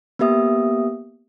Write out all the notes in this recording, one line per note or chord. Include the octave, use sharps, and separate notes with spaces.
A#3 B3 G4 E5 D#6